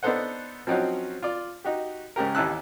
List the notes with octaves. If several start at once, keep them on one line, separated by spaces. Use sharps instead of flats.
B3 D4 D#4 A4 C5 F#5
F3 F#3 C4 C#4 D#4 F#4
F4 D5
D#4 F#4 G4
G#2 C#3 G4 A#4
A1 D#2 E4 A5 E6 F#6